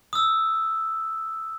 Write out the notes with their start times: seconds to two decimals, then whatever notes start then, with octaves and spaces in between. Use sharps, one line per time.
0.13 D#6 E6